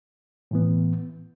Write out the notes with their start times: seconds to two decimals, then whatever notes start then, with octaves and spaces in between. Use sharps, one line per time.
0.51 A2 E3 B3